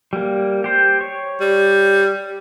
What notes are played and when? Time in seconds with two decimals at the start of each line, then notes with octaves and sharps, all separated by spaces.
0.13 G3 A#3
0.64 G4 C5
1.01 C#5
1.41 G3